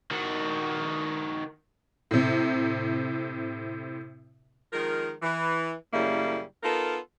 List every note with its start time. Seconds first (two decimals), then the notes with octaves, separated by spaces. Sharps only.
0.11 D#3 F#4
2.11 A2 C3
4.73 D#3 F3 G#3 A#4
5.23 E3
5.94 F#2 A2 C#3 G3 A#3 E4
6.63 B3 D#4 F4 A4 A#4